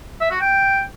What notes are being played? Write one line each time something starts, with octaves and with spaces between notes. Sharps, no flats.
E5
F#4
G5